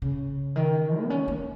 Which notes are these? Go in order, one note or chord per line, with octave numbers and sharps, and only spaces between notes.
C#3
D#3
B3
C#4
A#3